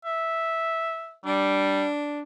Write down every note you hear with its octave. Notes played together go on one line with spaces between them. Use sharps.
E5
G3 D4